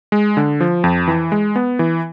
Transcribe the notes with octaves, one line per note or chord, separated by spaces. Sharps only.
G#3
D3
F3
F2
E3
G#3
B3
E3